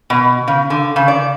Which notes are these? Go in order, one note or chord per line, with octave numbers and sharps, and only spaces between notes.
B2
C#3
D3
C#3
D5